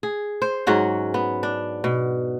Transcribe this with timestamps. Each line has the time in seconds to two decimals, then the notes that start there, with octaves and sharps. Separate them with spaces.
0.03 G#4
0.42 C5
0.67 G#2 F#3 C#4 F#5
1.14 B3
1.43 D4
1.84 B2